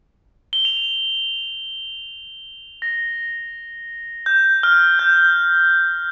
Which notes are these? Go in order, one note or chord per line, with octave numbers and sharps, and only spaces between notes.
G7
F7
A#6
G6
F6
G6